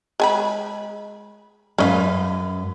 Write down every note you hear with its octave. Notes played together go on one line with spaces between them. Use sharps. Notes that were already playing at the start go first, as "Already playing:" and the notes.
G#3 G#5 B5
F#2 C#4 B4 D#5 F5